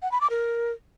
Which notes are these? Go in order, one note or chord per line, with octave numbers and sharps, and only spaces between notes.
F#5
B5
D6
A#4